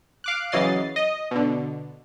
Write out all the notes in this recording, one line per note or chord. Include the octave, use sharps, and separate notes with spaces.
F5 D6 F#6
C#3 E3 F#3 D#5 A6 C7
D#5
B2 D3